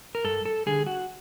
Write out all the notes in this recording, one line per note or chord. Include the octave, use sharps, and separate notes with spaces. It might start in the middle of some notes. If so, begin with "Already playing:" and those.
A#4
G2 A4
A4
D3 G3 G#4
F#4